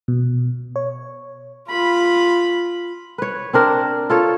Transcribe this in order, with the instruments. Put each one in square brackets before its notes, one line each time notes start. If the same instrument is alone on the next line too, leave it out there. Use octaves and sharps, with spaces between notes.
[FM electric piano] B2
C#5
[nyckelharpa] F4 B5
[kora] B4 C#5
C4 D4 A#4
F4 A4 C#5